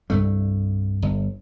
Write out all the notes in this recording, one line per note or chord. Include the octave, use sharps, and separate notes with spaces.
C2 G2 A3
G1